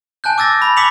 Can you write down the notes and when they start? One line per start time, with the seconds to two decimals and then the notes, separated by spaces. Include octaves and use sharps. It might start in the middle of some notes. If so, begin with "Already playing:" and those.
0.24 G#5 A5 F#6 G6
0.38 D6 E6 A6 A#6
0.62 B5
0.77 D6 D#6 B6 C#7 F7 F#7